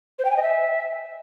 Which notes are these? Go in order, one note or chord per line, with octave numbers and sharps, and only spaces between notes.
C5
G5
G#5
D#5
E5